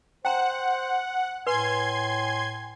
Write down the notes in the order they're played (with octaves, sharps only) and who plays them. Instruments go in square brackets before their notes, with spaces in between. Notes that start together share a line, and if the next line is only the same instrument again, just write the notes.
[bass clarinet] C5 [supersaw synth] F#5 [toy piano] G5 A#5
[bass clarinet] A2 [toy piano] B4 [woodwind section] G#5 [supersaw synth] C6 G#6